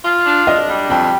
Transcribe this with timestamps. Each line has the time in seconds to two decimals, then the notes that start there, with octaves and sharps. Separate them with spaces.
0.05 F4
0.26 D4
0.47 D4 D#5
0.68 G3
0.90 F2 G5